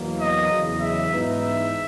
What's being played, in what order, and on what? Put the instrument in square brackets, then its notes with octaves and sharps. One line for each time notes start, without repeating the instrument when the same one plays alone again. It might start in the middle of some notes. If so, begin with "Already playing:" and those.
Already playing: [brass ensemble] E2 B2 F#3 A#3
D#5
E2 C#3 F#3
E5
G#2 E3 B3 D#4
E5